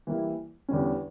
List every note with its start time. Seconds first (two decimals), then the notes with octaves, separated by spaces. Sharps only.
0.07 E3 G3 A#3 E4
0.68 E2 D3 G3 C#4